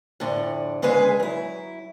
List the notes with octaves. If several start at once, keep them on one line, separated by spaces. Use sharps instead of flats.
F2 A2 D3
D2 C#3 G#3 G#4 B4 G#5
F#3 E4